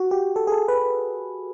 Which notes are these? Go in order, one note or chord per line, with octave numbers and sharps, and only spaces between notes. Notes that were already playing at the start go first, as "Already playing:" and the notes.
Already playing: F#4
G4
A4
G#4
A4
B4